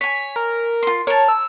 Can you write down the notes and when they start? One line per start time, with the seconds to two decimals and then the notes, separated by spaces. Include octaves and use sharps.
0.01 C#5 G#5 B6
0.36 A#4
0.83 F4 C6
1.07 A#4 C#5 A5
1.28 E6